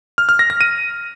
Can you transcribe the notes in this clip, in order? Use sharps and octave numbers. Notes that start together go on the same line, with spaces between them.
F6
F6
A#6
A#6
D#7